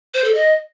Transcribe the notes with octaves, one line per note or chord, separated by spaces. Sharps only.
C5
A4
D#5